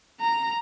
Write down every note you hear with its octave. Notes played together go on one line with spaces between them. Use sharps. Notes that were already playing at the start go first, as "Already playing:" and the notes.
A#5